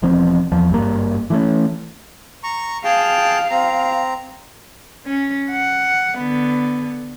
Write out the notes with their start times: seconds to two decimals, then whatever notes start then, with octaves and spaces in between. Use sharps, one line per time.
0.02 E1 E2 F3 C4
0.52 E2 F3
0.70 G#1 G2 A#3
1.30 E3 A3 C#4
2.44 A#5 C#6
2.85 G#4 F5 G5 A5
3.50 C4 A#5
5.06 C#4
5.50 F#5
6.17 D3 B3